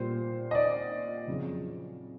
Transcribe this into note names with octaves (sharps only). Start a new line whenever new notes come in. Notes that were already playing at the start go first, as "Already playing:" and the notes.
Already playing: A#2 G3 C5
D#5
D5
F2 C#3 F#3